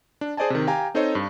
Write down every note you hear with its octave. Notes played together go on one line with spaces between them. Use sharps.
D4
G#4 C5 D5 D#5 G#5 A5
C3 D#3
G4 F5 G5 G#5 A#5
C4 D#4 A4 C5 C#5 D#5
G2